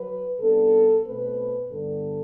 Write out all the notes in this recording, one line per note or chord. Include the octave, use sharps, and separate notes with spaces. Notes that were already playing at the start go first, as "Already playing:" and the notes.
Already playing: F#3 B4
C3 G3 B3 D4 A4
B2 A3 C4 B4
G2 D3 G3 B3 D4 A4